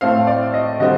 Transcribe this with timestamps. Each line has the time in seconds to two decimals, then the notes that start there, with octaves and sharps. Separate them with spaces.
0.01 A2 A3 C4 F5
0.27 D5
0.54 D#5
0.80 D3 G3 C4 D#5